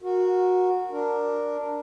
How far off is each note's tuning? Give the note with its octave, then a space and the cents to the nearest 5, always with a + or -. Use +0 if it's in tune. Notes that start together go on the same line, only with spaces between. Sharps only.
F#4 -15 A#4 +0
D4 +0 A#4 +0